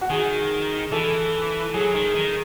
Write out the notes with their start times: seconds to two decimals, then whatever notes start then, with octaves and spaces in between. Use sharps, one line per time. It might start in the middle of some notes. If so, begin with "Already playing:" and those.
0.01 F#4
0.10 D#3 G#4
0.92 E3 A4
1.74 F#3 G#4
1.94 D#3
2.15 D#3